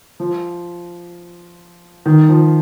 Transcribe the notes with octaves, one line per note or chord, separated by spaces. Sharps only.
F3
D#3
F3